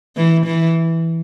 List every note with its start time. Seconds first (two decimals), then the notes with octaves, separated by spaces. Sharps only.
0.17 E3
0.46 E3